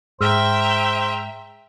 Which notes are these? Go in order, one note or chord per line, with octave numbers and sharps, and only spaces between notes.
G#2 G#4 C5 E5 G5 A#5 E6 F6